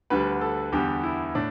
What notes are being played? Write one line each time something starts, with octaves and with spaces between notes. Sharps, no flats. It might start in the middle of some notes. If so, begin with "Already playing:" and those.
D2 D3 G3 B4
A4
E2 D3 G3 G4
E4
A2 D4